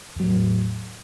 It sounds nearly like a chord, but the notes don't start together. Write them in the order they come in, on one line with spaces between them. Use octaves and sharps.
E2 F#3 A2